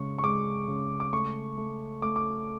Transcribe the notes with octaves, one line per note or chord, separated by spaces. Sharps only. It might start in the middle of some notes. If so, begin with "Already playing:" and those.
Already playing: C#3 G#3 C#6
C#6
G#3 D6
C#3
D6
A3 C#6
A3
A3 D6
D6